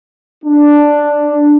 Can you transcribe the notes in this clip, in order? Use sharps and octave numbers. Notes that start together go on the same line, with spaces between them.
D4